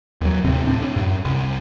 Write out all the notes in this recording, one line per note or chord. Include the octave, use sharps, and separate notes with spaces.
D#2 F#3
D#2 A2 C3 C4
A2 C4 D4
A2
F#2
C2